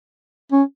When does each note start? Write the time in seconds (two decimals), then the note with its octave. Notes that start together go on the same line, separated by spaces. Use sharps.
0.52 C#4